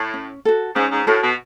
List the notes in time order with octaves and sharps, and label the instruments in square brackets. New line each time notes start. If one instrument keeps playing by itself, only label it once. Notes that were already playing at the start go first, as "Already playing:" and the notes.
Already playing: [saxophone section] A2
[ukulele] C#4
F#4 A4
[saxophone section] G#2 [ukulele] C#4
[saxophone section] G#2
[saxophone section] A2 [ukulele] F#4 A4
[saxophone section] B2